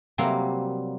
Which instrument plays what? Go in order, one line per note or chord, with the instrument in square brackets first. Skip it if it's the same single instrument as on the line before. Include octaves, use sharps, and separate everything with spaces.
[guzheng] C3 F#3 G3 A#3